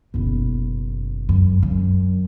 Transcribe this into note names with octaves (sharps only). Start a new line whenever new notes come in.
F#1 B2
F#2
F#2